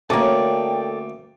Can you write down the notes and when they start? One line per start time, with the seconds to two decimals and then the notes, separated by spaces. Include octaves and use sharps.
0.10 D2 A#3 C#4 A4 D5 G5